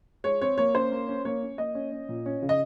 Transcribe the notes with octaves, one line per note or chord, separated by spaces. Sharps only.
G#3 C#5
C4 C#5
A#3 C#5
C#4 C5
A#3
C#4
A#3 C#5
C#4
A#3 D#5
C#4
C#4
A#2
C#4
C#3
D#5